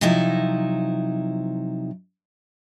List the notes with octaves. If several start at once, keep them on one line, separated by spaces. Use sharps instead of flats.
C3 F3 F#3 D#4 E4